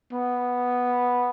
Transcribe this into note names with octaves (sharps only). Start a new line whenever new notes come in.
B3